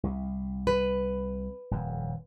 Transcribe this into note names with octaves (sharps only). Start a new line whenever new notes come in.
C2
B4
D#1 F2